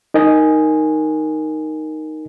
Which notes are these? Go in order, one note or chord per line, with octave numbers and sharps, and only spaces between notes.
D#4 A#4 D#5 G#5